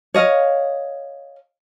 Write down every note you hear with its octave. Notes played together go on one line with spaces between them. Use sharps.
C#5 D#5 F5